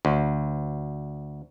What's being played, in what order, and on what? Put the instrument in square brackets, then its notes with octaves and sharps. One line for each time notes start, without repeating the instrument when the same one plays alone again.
[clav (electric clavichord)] D2